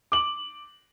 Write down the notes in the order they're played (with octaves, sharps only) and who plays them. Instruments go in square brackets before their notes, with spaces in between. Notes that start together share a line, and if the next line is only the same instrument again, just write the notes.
[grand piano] D6 F#7